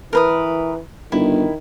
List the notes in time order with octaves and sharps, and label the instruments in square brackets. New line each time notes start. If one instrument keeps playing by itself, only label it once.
[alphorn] E3 [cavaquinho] A#4 B4 D#6
[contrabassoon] G1 [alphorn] D#3 [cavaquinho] E4